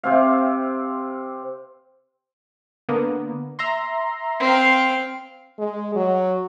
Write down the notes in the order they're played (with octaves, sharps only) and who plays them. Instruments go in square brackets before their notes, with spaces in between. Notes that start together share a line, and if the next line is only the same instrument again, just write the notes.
[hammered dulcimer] C3 C4 F5
[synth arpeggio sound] D3 A#3 B3
E5 A#5 C6
[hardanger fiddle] C4 F5
[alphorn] G#3
F#3